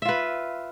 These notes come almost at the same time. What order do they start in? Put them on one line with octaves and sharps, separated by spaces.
E5 F4 B4